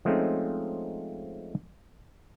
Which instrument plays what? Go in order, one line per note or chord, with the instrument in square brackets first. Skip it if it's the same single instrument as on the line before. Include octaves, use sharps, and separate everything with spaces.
[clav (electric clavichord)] F3 G#3 A3 C4 C#4 D#4